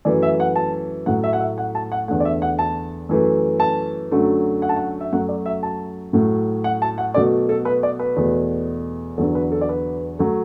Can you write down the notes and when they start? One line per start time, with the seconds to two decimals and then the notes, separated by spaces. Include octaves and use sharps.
0.05 F#2 E3 A3 D5
0.23 E5
0.40 F#5
0.56 A5
1.06 A2 F#3 A3 F#5
1.24 E5
1.33 F#5
1.40 E5
1.58 F#5
1.75 A5
1.92 F#5
2.08 E2 D3 A3 F#5
2.20 D5
2.25 E5
2.42 F#5
2.59 A5
3.09 F#2 E3 A3
3.60 A5
4.11 F#2 D3 F#3 A3
4.62 F#5
4.69 A5
4.76 F#5
5.00 E5
5.12 F#2 F#3 A3 F#5
5.29 D5
5.46 E5
5.63 A5
6.13 A2 F#3 A3
6.64 F#5
6.82 A5
6.98 F#5
7.14 B2 F#3 A3 D5
7.49 A4
7.65 B4
7.83 D5
7.99 B4
8.16 E2 B2 A3
9.18 E2 D3 F#3 A4
9.35 B4
9.52 A4
9.61 D5
9.69 B4
10.19 F#3 A3